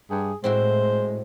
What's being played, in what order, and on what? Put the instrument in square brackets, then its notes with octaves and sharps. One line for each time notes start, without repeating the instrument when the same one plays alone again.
[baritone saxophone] G2 [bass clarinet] G#4
[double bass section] A2 [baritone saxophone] G#3 [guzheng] C4 E4 F#4 [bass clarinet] C5